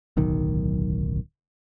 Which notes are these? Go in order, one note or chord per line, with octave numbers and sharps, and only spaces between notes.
D1 B1 D#3